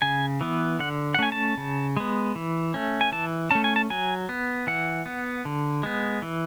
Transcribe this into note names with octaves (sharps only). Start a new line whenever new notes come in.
C#3 G#5
E3 B3
D3 F#5
F#5
A3 C#4 G#5
A5
C#3
G#3 B3
E3
A3 C#4
G#5
E3 A5
A3 C#4 A5
G#5
A5
F#3 G#5
B3
E3 F#5
B3
D3
G#3 B3
E3